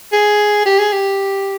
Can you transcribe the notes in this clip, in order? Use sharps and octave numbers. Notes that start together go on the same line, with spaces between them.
G#4
G4
G#4
G4